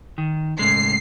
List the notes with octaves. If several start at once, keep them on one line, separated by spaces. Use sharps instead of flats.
D#3
A2 C#3 G#3 C7